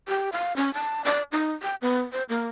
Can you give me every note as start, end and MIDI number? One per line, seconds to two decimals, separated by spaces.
0.09 0.30 67
0.33 0.55 77
0.56 0.73 61
0.74 1.04 81
1.05 1.23 74
1.32 1.51 63
1.62 1.75 79
1.82 2.01 59
2.12 2.23 72
2.29 2.48 58